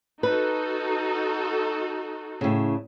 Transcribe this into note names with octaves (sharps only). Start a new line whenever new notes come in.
D#4 F#4 A4 B4
A2 C#3